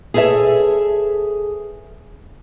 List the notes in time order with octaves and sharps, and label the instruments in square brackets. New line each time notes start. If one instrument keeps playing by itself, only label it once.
[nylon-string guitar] G#4 A4 B4 C#5 E5